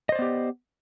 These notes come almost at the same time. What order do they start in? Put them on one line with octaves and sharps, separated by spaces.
D#5 C5 D5 B3 G4